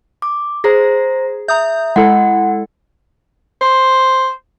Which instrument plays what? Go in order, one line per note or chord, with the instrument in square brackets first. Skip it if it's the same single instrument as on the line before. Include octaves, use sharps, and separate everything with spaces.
[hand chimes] D6
[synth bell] G#4 [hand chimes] C5 A#5 A#6
[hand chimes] E5 [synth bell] A#5 D#6 G6
[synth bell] G#3 E4 A4 [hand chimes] F#5
[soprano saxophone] C5